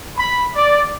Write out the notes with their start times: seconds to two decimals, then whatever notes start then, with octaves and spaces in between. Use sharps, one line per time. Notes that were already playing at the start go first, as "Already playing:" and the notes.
0.17 B5
0.55 D5